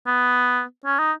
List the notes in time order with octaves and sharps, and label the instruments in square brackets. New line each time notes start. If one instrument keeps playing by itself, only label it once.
[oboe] B3
C#4
D#4